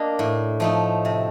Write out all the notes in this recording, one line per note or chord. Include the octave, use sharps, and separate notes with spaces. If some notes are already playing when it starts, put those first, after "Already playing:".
Already playing: A#3 D4 D#5
A2
F3 A3 D#4
C3